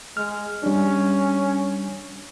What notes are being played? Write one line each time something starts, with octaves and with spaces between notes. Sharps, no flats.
G#3 F6
G3 C#4 D4